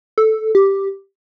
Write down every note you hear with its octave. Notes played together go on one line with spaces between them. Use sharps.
A4
G4